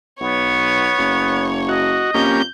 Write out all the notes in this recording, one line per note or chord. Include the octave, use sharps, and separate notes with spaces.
B1 B3 C#5
F#1
F#4 D#5
F2 A#3 C#4 G4 G6